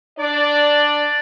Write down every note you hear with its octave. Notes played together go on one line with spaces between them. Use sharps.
D4 D5